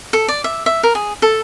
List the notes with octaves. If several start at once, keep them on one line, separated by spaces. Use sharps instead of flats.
A4
D5
E5
E5
A#4
G#4
A4